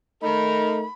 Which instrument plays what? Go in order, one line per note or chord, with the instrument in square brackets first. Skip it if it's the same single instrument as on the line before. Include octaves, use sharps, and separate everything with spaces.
[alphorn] A3 [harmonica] D#4 A#4 [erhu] B5